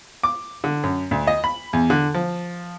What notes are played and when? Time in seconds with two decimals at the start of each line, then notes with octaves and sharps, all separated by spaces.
0.23 D6
0.64 D3
0.83 F#2
1.11 D2
1.27 D#5
1.44 B5
1.73 E2
1.90 D3
2.14 F3